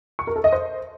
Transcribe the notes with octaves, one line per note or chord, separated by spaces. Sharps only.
C#6
A#4
A4
D#5
C5